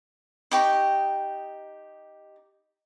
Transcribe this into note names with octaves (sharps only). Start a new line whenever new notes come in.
D#4 G4 C#6